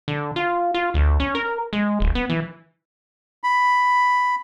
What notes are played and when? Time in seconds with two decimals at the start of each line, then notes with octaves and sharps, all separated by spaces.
0.08 D3
0.36 F4
0.74 F4
0.94 D2
1.20 C#4
1.35 A#4
1.73 G#3
2.00 D1
2.15 B3
2.30 E3
3.44 B5